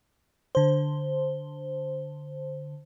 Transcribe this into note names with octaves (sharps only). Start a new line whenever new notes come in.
D3 C5